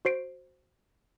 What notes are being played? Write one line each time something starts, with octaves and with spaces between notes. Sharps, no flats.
F#4 C5 C7 D7